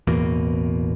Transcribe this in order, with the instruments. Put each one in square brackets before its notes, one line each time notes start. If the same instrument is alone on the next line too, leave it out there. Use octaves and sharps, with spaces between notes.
[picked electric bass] A1 E2 B2 A#3